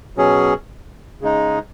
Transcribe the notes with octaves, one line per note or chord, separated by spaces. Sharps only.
B2 F#3 C#4 G#4
C#3 G#3 D#4